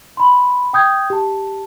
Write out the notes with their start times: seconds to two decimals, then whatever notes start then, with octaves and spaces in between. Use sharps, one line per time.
0.17 B5 C6
0.73 G5 D#6 G6 G#6
1.10 G4 A5